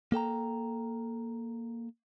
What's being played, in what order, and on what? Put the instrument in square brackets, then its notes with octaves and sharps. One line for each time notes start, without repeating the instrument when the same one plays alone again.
[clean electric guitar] A#3 A4 G5 A#5